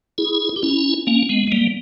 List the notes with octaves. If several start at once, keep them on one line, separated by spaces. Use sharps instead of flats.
E4 G#4
G4
C#4 E4
A#3 C#4
G#3 B3
G#3
G3 A#3